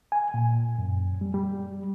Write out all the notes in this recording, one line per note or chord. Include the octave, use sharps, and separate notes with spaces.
G#5
A#2
F#2
G3
G3